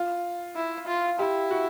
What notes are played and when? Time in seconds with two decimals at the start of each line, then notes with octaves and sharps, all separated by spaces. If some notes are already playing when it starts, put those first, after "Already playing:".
Already playing: F4
0.56 E4
0.87 F4
1.19 E4 G4
1.51 F#4